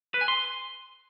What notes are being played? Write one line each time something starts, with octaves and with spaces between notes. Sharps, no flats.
B4
G#5
C6